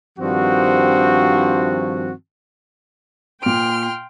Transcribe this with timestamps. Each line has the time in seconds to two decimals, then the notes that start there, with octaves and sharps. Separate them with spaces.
0.18 G2 D#3 F3 C4 F#4
3.43 A#2 G5 C6 F6 D7